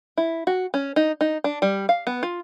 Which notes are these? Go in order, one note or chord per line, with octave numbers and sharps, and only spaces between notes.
E4
F#4
C#4
D#4
D#4
D4
G3
F5
B3
F4